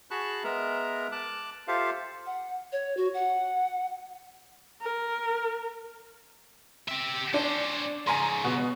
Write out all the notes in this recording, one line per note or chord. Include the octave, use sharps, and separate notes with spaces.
F#4 G#4 A5 B5 C#6 F#6
G#3 B3 A#4 E5 A#5
A5 D6 F#6
F4 G4 A4 C5 E5 F5
F#5
C#5
F#4
F#5
A#4
G4 E5
C#4 D4 C5
G#2 C#3 G#5 A#5 C6
B2